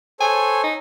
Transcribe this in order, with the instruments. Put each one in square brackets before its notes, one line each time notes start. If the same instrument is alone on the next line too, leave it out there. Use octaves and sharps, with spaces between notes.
[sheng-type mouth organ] A4 C5 C#5 [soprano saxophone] G#5
[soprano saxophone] D#4